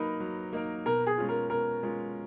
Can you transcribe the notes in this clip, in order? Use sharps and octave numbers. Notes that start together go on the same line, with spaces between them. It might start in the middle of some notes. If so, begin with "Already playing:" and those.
Already playing: F#3 A#3 D#4 A#4 B4
F#3
A#3 D#4 A#4
B2 A#4
G#4
G#3 C#4 F4
A#4
B2 A#4
G#3 C#4 F4